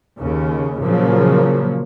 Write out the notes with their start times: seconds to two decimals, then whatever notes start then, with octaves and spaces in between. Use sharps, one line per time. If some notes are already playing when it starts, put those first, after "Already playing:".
0.19 D#2 C#3
0.81 A#2 C#3 F3 F#3 A#3